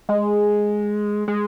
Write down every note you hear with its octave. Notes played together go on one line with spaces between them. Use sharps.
G#3
G#3